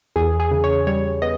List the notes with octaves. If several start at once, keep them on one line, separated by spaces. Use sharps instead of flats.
E2 G#4
G#4
C#3
C#5
G3 C#5
B3 D#5